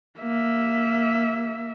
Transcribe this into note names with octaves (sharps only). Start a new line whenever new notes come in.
A#3 E5